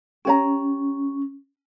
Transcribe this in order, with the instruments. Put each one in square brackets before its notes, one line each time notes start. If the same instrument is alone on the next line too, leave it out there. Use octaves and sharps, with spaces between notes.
[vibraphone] C#4 [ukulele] G4 C#5 A#5